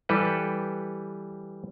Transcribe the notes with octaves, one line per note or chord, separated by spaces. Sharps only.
E3 G3 G4 A4 B4